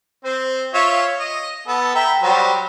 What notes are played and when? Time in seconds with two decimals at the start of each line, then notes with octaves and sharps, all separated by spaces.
0.25 C4 C5
0.74 F4 C#5 E5
1.20 D#5
1.68 B3 A4
1.95 E5 G5 A#5
2.23 F#3 G3 C5